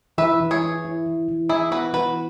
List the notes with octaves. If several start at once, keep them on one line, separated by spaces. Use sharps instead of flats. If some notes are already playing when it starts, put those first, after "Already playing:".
E3 B4 E5
E3
G#4 C#5
E4
E4
E3
E3
E3 E4 G#4
B3 F#4 B4
E3 F#4 B4